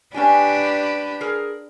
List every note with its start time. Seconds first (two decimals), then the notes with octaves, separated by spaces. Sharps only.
0.14 C#4 D4 G4 B4 G5 G#5
1.21 G#4 A#4